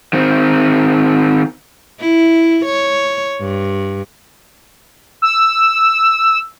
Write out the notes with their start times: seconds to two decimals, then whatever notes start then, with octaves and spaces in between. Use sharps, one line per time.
0.13 D#3 C4
2.00 E4
2.65 C#5
3.40 G2
5.22 E6